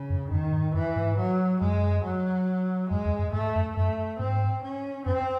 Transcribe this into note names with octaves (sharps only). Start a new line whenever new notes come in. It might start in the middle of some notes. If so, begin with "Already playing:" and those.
Already playing: C#3
F#2
F#2 D#3
G#2
F#2 E3
G#2
F#3
F#2 G#3
F#3
F#2 G#3
E2
F#2
G#2 A3
F#2
F#2 A3
G#2 C4
C#4
F#2 C4